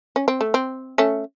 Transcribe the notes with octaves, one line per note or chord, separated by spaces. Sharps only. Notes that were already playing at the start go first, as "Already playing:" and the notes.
C#4
C4
A3
C4
A3 C#4